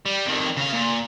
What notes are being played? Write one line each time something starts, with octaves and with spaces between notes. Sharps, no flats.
G3
F2 D#3
C#3 F5
A#2